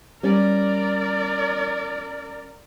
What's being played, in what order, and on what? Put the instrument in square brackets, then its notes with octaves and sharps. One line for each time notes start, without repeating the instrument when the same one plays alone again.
[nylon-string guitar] G3 C#4 [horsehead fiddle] A#4 D5